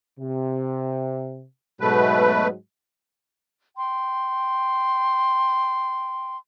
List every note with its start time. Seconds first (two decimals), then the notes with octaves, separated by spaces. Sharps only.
0.19 C3
1.81 G#2 B2 F#3 G#3 A3 B4
3.77 G5 C6